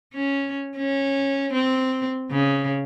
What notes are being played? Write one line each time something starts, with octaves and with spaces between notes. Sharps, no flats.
C#4
C#4
C4
C#3